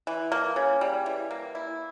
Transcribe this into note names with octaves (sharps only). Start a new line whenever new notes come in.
E3
A#3
C#3
G3
E3
A#3
E4